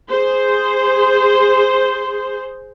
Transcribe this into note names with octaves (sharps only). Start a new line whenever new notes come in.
G#4 C5